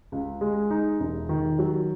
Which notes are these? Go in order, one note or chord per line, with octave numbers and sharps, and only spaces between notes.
C#2
G#3
D#4
E1
D#3
F#3